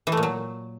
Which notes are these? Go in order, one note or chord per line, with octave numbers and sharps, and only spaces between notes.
E3
A3
A#2
F#3